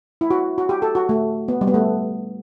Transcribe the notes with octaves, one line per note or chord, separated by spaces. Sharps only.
E4
F#4
F#4
G4
A4
F#4
A3
B3
G3
B3
A3